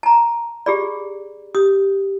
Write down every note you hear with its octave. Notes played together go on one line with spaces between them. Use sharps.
A5 A#5
G4 G#4 D5 B5
G4 D#6